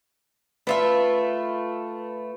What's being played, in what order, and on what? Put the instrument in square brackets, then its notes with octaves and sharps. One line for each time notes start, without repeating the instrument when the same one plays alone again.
[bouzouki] A3 F4 E5 [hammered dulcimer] B4